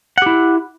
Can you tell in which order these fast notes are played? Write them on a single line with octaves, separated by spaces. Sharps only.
F#5 G4 E4